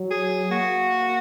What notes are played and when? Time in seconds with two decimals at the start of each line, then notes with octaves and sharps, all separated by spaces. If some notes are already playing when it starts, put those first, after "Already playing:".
Already playing: F#3
0.11 G#4
0.50 A#3 F#4